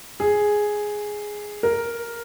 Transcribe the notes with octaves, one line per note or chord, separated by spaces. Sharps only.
G#4
A#4